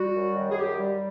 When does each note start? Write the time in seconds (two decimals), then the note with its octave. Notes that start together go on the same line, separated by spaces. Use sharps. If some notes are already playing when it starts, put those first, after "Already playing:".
Already playing: G3 F#4
0.15 F#2
0.35 D#3
0.49 G#4
0.57 F#2 G4
0.77 G3